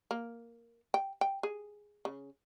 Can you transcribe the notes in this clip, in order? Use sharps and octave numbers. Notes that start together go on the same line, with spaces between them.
A#3
G5
G5
G#4
C#3